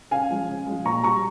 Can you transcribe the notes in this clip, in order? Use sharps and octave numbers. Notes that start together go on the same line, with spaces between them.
C#3 F5 G#5
F3 G#3
C#3
F3 G#3
A#2 A#5 C#6
G3 A#5 C#6